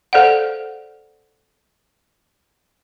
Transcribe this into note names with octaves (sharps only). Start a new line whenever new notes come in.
A4 C5 D5 F5 F#5